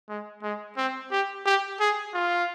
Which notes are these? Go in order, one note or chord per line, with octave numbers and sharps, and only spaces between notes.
G#3
G#3
C4
G4
G4
G#4
F4